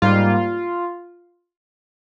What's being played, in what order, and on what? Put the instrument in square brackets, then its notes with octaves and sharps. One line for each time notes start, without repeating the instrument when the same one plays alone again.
[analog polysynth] G#2 G3 A#3 F4